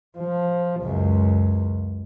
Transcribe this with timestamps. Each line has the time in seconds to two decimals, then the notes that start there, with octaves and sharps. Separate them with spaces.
0.18 F3
0.81 C#2 F#2